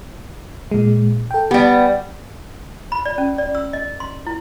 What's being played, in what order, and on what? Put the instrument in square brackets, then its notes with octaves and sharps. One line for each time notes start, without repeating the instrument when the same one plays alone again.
[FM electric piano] A#2 G#3
A4 G5
[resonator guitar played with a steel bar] G3 B3 [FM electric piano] G4
[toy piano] B5
D5
C#4
D5
E6
D#5
C6
E4